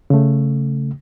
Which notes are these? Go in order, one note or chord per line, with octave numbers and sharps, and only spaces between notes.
C#3 A3